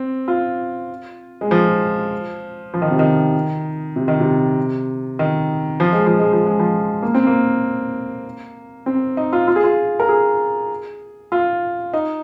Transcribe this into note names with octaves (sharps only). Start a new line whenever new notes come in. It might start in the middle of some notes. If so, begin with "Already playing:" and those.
Already playing: C4
F4
G#3
F3
F3
D#3
C3
D#3
C3
D#3
C3
D#3
F3
G#3
F3
G#3
F3
G#3
F3
A#3
C4
A#3
C4
D#4
F4
F4
G#4
F4
A#4
G#4
F4
D#4